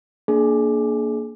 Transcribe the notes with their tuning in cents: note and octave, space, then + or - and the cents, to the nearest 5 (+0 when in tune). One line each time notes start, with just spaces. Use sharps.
A#3 +0 D4 +0 G#4 +35